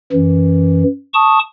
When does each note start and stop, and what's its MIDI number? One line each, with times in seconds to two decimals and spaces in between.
0.13 0.84 42
0.13 0.84 52
1.14 1.39 81
1.14 1.39 85
1.14 1.39 87